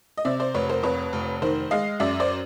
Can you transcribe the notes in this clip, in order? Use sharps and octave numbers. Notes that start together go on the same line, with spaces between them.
D#5
C3 D5 E5
C5 D5
F1 B4 C#5
A#4 C5
F2 B4 C#5
F1
D#3 A#4 C5
G#3 D#5 F5
F#2 D5 E5
C5 D5